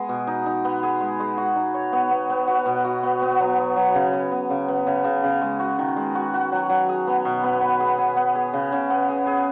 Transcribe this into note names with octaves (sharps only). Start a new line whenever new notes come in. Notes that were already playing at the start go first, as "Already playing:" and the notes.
Already playing: G#3 B3 G#4
B2
D#4
D#4
B3
G#4
G#3
G#3
F#4
D#4
C#5
B3
B3
B3
F#4
B2
F#4
B3
B3
F#3
B3
F#3
C#3
B3
B3
C#3
B3
C#3
C#3
C#3
G#3
F#4
D#3
G#3
F#4
F#4
F#3
F#3
G#4
B3
B2
B3
B4
G#4
G#4
B3
G#4
C#3
C#3
B3
G#4
G#4